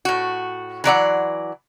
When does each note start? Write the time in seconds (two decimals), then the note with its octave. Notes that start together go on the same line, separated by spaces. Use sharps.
0.05 A2 F#4
0.84 E3 F#3 D5 F#5